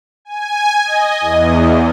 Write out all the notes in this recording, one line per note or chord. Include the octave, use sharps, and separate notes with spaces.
G#5
D#5
E2